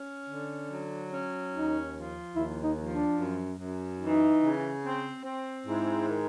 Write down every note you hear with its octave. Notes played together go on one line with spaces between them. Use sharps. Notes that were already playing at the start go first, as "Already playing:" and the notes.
Already playing: C#4
D3
F#3
C#4
D#2 D#4
F3
D#2 E4
D#4
F3
D4
F#2
F#2
E3 D#4
C#3
C4
C4
G#2 E4
D#3